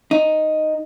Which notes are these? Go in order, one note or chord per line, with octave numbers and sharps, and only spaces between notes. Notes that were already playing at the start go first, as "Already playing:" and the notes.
D#4